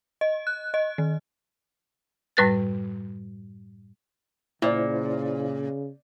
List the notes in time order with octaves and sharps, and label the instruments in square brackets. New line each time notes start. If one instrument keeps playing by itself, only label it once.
[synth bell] D#5
F#6
D#5
D#3
[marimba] F#2 A2 G3 B4 F#6 A6
[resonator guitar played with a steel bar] A#2 [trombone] C#3 [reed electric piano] E4 C5 D5